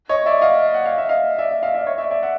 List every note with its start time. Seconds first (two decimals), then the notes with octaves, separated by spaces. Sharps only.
0.09 C#5 D#5
0.26 D5 E5
0.42 D#5 F5
0.74 F#5
0.86 F5
0.98 E5
1.09 D#5 F5
1.39 D5 E5
1.62 D#5 F5
1.74 D5 E5
1.87 C#5 D#5
1.98 D5 E5
2.10 D5 E5
2.23 E5 F#5